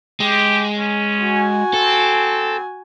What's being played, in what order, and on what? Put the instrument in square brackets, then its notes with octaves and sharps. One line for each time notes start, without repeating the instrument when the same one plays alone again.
[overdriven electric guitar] G#3 [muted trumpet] G4
[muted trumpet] C#4
[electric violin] F#4 G#5
[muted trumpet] C4 [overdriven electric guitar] A4